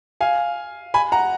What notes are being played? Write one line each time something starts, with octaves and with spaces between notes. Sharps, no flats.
F5 G#5
G#5 B5
F#5 A#5